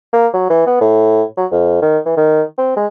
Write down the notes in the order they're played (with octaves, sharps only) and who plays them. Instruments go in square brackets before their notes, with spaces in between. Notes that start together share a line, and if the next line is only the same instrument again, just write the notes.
[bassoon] A#3
F#3
E3
B3
A2
F#3
F2
D#3
E3
D#3
C4
G#3